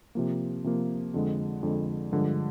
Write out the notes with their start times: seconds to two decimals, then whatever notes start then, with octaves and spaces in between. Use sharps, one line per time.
0.15 C3 F3 A#3
0.64 C3 F3 A#3
1.14 F2 D3 G#3
1.63 F2 D3 G#3
2.12 G2 D3 F3 G#3